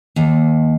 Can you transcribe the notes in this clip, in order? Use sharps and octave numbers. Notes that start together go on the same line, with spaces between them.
D#2